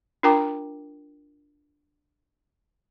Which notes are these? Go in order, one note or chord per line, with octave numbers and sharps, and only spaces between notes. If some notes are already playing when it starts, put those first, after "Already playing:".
D4 F4 A#4 G5 A#5 D6